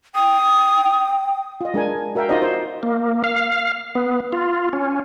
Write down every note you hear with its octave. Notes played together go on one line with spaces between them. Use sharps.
G5 D#6
F4 D#5
G#3 D4 A#4 G#5
F#4 A#4 E5 F5 G5
D#4 F4 F#4 C5 D5 D#5
C5
A#3
F5
B3
F4
C#4